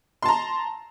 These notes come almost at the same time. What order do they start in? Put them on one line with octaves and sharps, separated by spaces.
C6 A5 A#5